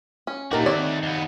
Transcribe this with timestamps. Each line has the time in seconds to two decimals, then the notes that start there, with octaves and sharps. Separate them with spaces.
0.27 C#4
0.51 A#2 A3 A#3 D#4 F#4 G4 A#4 A#5
0.66 D#3 C4 C#5 D5
1.03 D#2 B3